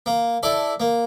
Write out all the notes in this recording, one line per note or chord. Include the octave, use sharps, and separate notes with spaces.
A#3
E4 A4 D5
A#3